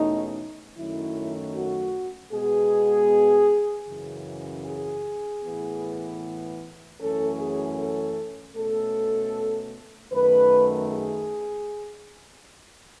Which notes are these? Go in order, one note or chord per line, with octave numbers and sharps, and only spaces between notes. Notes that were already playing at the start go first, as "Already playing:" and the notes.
Already playing: E2 B2 A3 C#4 D#4
F#2 D#3 F#3 A3 C#4 E4
F#4
B2 G#3 B3 G#4
F#2 C#3 E3
G#4
A2 E3 B3
F#2 E3 A3 C#4 A4
G#4
A4
B2 A3 C#4 A4
F#2 D#3 A3 B4
G#4